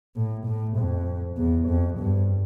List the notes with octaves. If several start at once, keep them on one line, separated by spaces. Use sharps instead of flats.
A2
A2
F2
E2
F2
G2